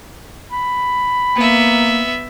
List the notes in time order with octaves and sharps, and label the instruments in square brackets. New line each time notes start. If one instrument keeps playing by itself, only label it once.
[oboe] B5
[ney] A#3 [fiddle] B3 E5